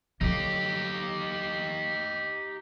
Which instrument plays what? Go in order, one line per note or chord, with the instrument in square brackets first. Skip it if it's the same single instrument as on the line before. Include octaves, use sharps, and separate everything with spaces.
[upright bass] D3 F#3 [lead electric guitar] D#4 G4